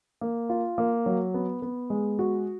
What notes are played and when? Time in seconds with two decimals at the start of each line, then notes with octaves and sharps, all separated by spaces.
0.21 A#3
0.49 F4
0.78 A#3
1.06 F#3
1.34 B3
1.62 B3
1.90 G#3
2.19 F#4